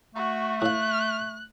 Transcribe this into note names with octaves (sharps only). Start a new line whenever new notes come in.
A3 F#4
A2 F5 F#6